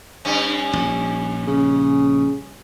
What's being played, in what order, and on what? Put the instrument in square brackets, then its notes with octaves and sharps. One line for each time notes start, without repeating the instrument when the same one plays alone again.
[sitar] G2 C#4
[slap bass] A#1 G#2
[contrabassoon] C#3